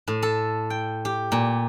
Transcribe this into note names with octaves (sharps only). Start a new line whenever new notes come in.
A2
A4
G5
G4
A#2